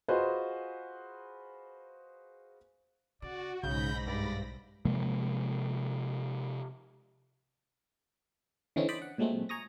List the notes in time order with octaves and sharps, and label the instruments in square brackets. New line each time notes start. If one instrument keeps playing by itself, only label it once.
[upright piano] F4 F#4 G#4 B4 C5 D#5
[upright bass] C#3 [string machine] F#4 [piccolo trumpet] D5
[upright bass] B1 [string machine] G#2 B5 A#6 [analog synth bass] C#3 [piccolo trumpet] G6
[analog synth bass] G2 [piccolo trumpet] D5
[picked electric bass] C3 F3 G#3 A#3
[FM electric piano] D3 E3 C4 C#4 D#4
C5 D5 D#5 B5 D6
F#5
A#2 F#3 G#3 A3 C4
G#5 A#5 C#6 D#6 A#6